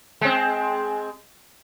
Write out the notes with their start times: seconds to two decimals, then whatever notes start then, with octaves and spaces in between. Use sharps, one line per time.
0.21 G#3 C4